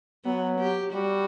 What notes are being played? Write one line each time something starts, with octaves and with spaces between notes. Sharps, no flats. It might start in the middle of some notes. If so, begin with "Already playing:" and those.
F#3 B3
G4
G3 F#4